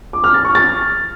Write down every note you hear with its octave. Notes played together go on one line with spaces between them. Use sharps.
D6
F6
A6
C#6
A6